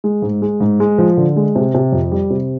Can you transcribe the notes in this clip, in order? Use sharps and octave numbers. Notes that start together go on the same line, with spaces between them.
G#3
G#2
G#3
G#2
G#3
F3
D3
G#3
C3
C3
F2
G3
C3